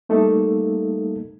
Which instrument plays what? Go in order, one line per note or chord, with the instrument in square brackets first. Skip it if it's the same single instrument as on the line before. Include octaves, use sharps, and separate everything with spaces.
[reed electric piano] G3 A3 A#3 D#4 A4